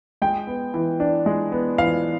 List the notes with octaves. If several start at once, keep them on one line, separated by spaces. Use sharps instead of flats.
G#3 G5
B3
E3
D4
G#3
B3
E3 F5